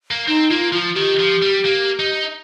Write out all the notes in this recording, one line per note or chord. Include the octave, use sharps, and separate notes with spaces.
A#3
C4 D#4
A#3 F4
F3 F4
D#3 G4
F3
G3
A#3
D#4